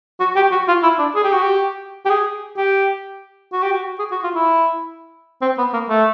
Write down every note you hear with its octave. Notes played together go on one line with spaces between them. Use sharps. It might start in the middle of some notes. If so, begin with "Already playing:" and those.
F#4
G4
F#4
F4
E4
D4
G#4
G4
F#4
G4
G4
G#4
G4
F#4
G4
F#4
G#4
F#4
F4
E4
C4
B3
A#3
A3